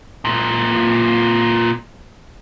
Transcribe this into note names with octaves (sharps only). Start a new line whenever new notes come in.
A#2 E3